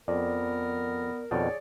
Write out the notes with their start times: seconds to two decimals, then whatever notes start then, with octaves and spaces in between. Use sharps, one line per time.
0.08 F2 B3 A#4 D5
1.31 F2 B2 D#3 G#4 C#5 D5